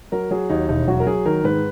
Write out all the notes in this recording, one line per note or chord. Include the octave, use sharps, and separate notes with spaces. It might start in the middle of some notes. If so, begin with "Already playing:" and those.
F#3 A#4
F#3 G#4
D#2 D#4
E1 D#4
F#3 F#4
A#4
F#3 G#4
D#3 A#4
G#2 B4